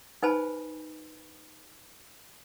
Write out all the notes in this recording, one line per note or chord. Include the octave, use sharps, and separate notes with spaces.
D#4 B4 C5 G#5 A5 B5